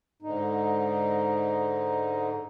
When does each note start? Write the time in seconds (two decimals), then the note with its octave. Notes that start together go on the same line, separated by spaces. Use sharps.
0.22 G#2 D3 D#4